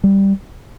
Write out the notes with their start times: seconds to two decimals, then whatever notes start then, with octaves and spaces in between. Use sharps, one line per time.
0.04 G3